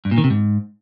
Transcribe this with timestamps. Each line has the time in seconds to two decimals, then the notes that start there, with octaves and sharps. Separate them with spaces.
0.05 G2
0.11 A#2
0.18 D#3
0.24 C3
0.30 G#2